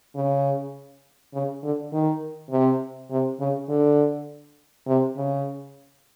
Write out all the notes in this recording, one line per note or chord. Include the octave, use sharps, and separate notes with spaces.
C#3
C#3
D3
D#3
C3
C3
C#3
D3
C3
C#3